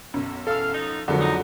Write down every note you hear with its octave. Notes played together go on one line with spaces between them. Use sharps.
B1 F#2
E2 A4 F5 E6
F3 D#4
F2 D3 F#3 G#3 A#4
D#4